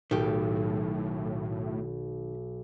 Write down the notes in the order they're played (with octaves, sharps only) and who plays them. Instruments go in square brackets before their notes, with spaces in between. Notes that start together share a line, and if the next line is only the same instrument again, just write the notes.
[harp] B1 [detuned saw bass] A2 [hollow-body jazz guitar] D#3 G4